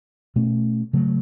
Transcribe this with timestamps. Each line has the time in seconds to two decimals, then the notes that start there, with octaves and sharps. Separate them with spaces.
0.36 B2 A3 C#4
0.93 C#3 F#3 A3